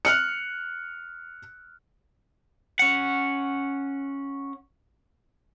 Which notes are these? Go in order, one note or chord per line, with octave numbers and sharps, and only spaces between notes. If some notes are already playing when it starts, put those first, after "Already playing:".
F6 F#6 C#7
C#4 F#5